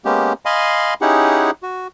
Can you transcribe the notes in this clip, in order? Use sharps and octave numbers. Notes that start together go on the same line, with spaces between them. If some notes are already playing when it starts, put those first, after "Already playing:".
G#3 A#3 B3 C#4 G4
D#5 F5 G#5 B5 C6
C#4 D#4 E4 G4 G#4 F#5
F#4